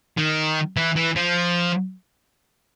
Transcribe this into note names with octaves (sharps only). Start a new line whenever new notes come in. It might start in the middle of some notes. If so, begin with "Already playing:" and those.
D#3
E3
E3
F3